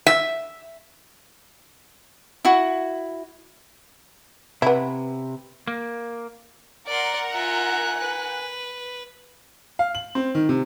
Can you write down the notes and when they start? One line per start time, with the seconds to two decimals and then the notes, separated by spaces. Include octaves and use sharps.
0.07 E5
2.45 E4 F#4
4.62 C3 B3 E4
5.67 A#3
6.87 A#4 D5 F#5 A#5 C6
7.33 F4 E5 G#5 F#6
7.98 B4
9.79 F5
9.95 F#7
10.15 C4
10.35 D#3
10.49 C3